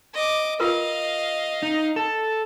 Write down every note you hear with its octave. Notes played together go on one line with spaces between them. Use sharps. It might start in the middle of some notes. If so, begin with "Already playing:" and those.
D#5 D6
F4 A#4 B4 D#5 F5
D#4
A4